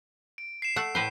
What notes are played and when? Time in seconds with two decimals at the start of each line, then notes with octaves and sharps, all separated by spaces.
0.38 D7
0.62 C7 E7
0.76 A3 F#5
0.95 A2 B4 C5 C7